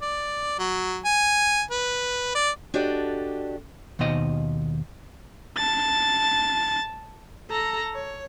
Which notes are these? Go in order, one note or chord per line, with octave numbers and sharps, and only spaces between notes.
D5
F#3
G#5
B4
D5
D4 F#4 G4 A4 D5 D#5
D#2 B2 D#3 C5 D#5
A5 A6
A4 A#5
C#5